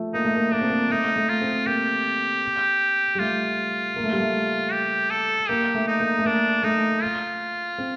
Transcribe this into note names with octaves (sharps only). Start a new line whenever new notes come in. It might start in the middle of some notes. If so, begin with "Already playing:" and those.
Already playing: F3 A3
A#3 D#4
A3
A#3
A#3 D4
C4
A#3
A3 D#4
A3
F4
C4
A#3 G4
G3
A3 F4
A#3
A3
G3
A3
G4
A4
A#3 G4
A3
D#4
A#3
A3
A#3 D4
A3 D#4
F4
C4